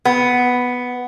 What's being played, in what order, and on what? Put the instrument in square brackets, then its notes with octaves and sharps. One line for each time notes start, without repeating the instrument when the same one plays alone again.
[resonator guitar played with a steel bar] B3